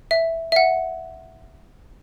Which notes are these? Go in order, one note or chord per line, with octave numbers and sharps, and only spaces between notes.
E5
E5
F#5